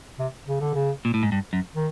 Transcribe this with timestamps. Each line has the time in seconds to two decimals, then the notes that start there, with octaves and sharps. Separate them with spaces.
0.18 C3
0.47 C#3
0.61 D3
0.74 C#3
1.05 A#2
1.14 A2
1.23 G#2
1.32 G2
1.53 F#2
1.75 D#3